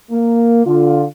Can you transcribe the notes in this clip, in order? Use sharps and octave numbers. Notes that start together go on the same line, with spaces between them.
A#3
D3 F4